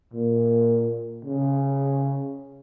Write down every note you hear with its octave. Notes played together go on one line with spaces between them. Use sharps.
A#2
C#3